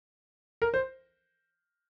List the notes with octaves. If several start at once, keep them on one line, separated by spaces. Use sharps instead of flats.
A#4
C5